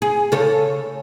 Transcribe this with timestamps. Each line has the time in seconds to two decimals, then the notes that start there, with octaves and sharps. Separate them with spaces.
0.02 G#4
0.32 C#3 A4 C#5